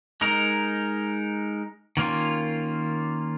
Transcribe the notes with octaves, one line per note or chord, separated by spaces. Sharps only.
G#3 D#4 A#4
D#3 A#3 C#4 F4